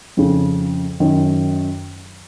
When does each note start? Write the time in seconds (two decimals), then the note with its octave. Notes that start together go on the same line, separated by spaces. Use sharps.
0.17 F2 C#3
1.00 F#2 D#3